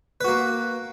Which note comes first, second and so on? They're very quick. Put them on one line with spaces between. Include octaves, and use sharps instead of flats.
B4 F#4 A#3